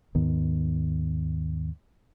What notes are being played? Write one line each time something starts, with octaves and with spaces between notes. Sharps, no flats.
D#2 G#2 D#3 B3